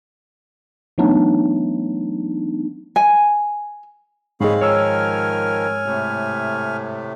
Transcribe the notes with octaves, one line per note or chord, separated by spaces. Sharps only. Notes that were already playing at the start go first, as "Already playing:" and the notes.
E3 F#3 A3 B3 D4 D#4
G#5
G#2 G#3 C4 G#4 C#5 F5 B5
D#3 F3 A#4 C#5 G#5 E6 F6
A2 C3 A3